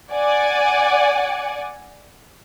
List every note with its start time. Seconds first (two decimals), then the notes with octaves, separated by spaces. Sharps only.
0.13 D5 F#5 G#5